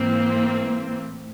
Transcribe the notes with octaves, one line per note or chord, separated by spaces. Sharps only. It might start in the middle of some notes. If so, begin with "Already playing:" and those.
Already playing: G#2 E3 A#3 C4
A2